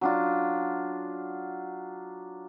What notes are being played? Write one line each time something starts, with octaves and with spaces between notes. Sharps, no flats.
F#3 D4 F4